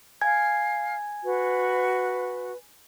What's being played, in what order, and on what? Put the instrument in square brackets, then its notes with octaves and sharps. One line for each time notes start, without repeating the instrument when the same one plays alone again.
[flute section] F5 [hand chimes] G#5 G#6
[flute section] F#4 B4